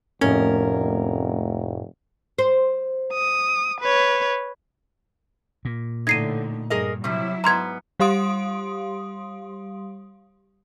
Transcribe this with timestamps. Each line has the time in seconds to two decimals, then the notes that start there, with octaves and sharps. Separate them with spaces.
0.21 F1 F2 A2 A#3 C#4 A#4
2.38 C5
3.13 D#6
3.81 B4 C#5
5.65 A#2
6.07 A2 D3 D#4 G#6 C7 D#7
6.70 G2 G#4 A#4 D#5
7.04 C3 F#3 G3 E4
7.44 G#2 B3 A#5 C6 G#6
8.00 G3 G4 F5 C6 D#6 D7